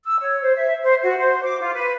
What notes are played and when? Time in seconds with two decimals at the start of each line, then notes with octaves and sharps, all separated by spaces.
0.05 E6
0.19 C#5
0.41 C5
0.55 E5
0.83 C5
1.02 F#4
1.18 C5
1.42 D6
1.60 F4
1.73 B4